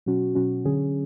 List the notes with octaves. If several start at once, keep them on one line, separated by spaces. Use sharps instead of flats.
B2 F#3 C#4 F#4
B2 F#3 C#4 F#4
D3 F#3 C#4 G#4